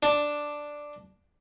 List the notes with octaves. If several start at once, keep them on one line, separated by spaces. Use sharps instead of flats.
D4